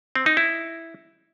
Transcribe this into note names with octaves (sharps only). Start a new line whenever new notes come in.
C4
D#4
E4